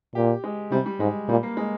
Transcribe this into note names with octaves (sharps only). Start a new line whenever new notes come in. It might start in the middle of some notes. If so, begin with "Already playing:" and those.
A#2 G4
G#3
C3 G3
G3
G#2 G#3
A#2 G3
A#3
G#3